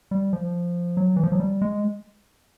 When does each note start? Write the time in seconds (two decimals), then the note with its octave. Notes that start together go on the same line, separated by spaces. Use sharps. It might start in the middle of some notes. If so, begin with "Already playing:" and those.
0.11 G3
0.33 F3
0.97 F#3
1.16 E3
1.24 F3
1.32 F#3
1.40 G3
1.62 G#3